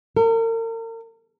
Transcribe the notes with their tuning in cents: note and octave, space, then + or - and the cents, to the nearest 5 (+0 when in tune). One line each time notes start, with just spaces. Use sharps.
A#4 -40